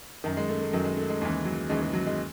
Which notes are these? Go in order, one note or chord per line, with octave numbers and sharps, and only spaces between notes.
F#2 D#3
G#3
A3
A3
F#2 D#3 F#3
G#3
A3
G#3
D#2 C#3 E3 G#3
F#3
D#2 C#3 E3 G#3
G#3
F#3
G#3